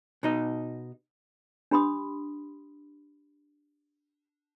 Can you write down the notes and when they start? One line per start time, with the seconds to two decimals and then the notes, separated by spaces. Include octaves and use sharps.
0.23 B2 D#4 D#5
1.71 D4 G4 B5 C6 D#6